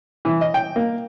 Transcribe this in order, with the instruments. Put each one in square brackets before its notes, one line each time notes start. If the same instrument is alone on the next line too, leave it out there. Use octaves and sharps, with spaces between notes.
[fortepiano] E3
D#5
G5
A#3